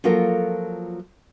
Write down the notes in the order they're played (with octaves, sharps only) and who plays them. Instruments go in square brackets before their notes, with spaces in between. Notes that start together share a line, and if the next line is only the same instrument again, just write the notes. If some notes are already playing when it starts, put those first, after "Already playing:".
[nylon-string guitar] F3 F#3 A#3 F4 A4 A#4